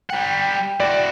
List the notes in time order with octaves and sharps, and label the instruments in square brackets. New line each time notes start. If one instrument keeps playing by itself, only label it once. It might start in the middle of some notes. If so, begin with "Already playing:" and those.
[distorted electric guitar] G3 F#5 [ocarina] G5
[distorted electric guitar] E4 F#4 [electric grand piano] D5